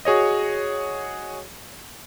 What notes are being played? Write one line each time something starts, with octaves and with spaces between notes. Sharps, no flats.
F#4 G#4 C#5 D#5